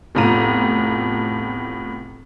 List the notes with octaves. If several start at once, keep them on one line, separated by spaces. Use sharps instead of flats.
F1 E2 A2 F4 A#5 D#7